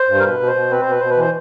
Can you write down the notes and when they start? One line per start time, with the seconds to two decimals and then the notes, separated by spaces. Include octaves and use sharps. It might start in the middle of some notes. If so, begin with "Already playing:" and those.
Already playing: C5
0.09 G2
0.20 A#4
0.24 B2 B4
0.40 B2
0.47 C5
0.56 B2
0.71 C4 B4
0.81 C5
0.86 B2 B4
1.00 B2 C5
1.10 B4
1.17 E3 C5